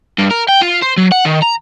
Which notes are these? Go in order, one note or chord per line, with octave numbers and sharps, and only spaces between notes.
G2
A#4
G5
F4
C5
F#3
F#5
D#3
A#5